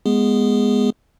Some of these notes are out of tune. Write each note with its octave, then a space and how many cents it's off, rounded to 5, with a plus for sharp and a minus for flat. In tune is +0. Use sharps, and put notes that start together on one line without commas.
G#3 +0 B3 -10 G#4 -10